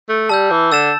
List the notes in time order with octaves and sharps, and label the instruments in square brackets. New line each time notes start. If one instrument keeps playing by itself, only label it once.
[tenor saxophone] A3
[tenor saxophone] G3 [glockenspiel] A5 E6 G6
[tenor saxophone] E3
[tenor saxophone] D3 [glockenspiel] E6 A6 E7